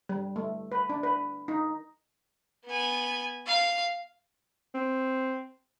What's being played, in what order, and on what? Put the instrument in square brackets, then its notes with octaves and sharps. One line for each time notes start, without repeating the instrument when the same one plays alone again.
[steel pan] G3
A3
B4
D4
B4
D#4
[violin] B3 G#5
F5
[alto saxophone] C4